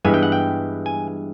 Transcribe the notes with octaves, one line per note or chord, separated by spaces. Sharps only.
G2 E3 G#3 B3 G#5
G5
F#5
G5
G#5